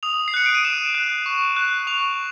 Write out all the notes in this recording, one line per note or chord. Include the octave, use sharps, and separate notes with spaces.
D#6 F7
C7
F#6 C#7
D7
D#7
D#6 E7
F#6
C#6
F#6
C#6 F7